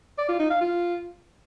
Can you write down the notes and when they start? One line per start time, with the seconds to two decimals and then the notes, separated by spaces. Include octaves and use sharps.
0.18 D5
0.29 F4
0.40 D#4
0.50 F5
0.61 F4